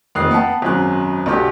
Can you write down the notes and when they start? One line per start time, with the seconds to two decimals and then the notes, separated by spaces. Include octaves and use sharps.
0.15 F1 D#3 D#6 F#6 C7
0.31 B3 G5 A5
0.62 G#1 F#2 F#6
1.26 B1 B2 D3 G4